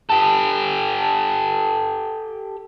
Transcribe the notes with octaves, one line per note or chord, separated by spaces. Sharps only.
G4 A4